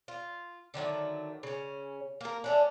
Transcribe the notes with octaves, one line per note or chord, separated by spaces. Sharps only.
F4
D3 D#3 F#3 A3
C#3 C#4
A#3 A#4
A3 C#4 D4